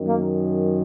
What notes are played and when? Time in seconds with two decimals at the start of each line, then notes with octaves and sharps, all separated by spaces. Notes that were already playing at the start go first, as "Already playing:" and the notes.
Already playing: F#2 D#3
0.08 A#3